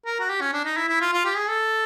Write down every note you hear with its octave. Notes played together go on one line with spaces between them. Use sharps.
A#4
F#4
G4
C#4
D4
D#4
E4
E4
F4
F4
G4
G#4
A4